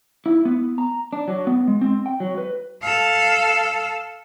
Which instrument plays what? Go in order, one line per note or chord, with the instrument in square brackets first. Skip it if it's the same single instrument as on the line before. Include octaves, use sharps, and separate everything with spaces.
[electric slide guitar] E4
B3
A#5
D4
F#3
B3
G#3
C4
G5
F#3
B4
[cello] A4 F5